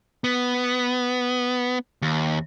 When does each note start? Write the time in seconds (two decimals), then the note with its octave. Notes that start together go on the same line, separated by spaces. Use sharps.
0.24 B3
2.02 D#2